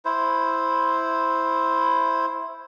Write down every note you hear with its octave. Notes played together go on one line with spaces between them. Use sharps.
E4 C5